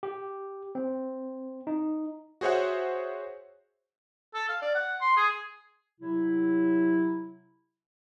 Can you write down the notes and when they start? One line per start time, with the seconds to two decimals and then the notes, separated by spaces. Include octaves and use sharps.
0.03 G4
0.75 C4
1.67 D#4
2.41 F#4 G#4 C5 C#5 E5 F#5
4.34 A4
4.49 F5
4.62 D5
4.75 F#5
5.01 C6
5.17 G#4
6.00 C3 F#3 E4